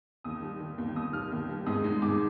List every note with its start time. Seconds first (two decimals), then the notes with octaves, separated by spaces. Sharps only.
0.24 D#2 D#6
0.42 G3
0.60 D#3
0.78 D#2
0.96 D#2 D#6
1.13 G3 F6
1.32 D#2
1.49 G3
1.66 G#2 D#6
1.84 G#3
2.02 G#2 D6